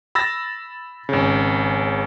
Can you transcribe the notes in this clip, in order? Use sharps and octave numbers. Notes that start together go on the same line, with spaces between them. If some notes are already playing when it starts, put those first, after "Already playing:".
B5 E6 A6 A#6
G#1 C#3